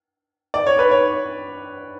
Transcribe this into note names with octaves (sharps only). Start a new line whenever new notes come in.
D5
C#5
B4
C#5